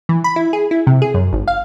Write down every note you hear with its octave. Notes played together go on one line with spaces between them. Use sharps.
E3
B5
E4
G#4
E4
C3
G#4
F#2
G#1
F5